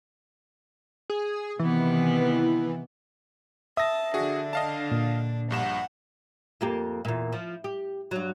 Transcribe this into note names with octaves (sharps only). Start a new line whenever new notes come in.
G#4
C3 D#3 E3 B3
E5 A5 D#6 A#6
D3 D4 F#4 G#4
D#5 F5 A5
A#2
A#1 G2 F#5 E7
F2 A#3 G4
E2 A#2
F3
G4
G2 F#3